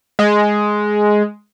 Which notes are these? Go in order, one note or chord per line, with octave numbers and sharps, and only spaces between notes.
G#3